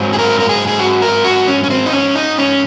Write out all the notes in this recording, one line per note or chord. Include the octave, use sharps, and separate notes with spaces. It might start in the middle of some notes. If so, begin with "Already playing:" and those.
Already playing: G#2 F#3 C4
G#4
A#4
A#4
G#4
G#4
F#4
A#4
F#4
C#4
C#4
C4
D#4
C#4
D#4
C#4